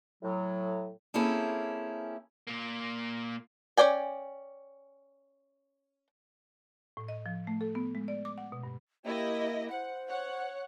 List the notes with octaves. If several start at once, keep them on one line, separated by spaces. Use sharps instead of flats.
A2 F#3
A#3 C4 C#4 E4 G#4 A4
A#2 A#3
C#4 C5 D5 G5 G#5
A2
D#5
F3
A3
A4
B3
G#3
D5
D6
F#5
B2
G2
A#3 E4 G4 D#5
C5 F#5
C#5 F#5 F#6